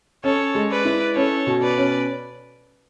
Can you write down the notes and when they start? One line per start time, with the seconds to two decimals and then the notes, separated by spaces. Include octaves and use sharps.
0.24 C#4 A4 C#5
0.55 G#3
0.70 B4 D5
0.85 E4
1.16 C#4 A4 C#5
1.47 B2
1.62 B4 D5
1.78 C#4